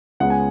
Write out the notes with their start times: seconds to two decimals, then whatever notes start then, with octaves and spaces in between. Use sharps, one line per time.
0.20 C#2 C#3 G#3 B3 F#5
0.30 G#5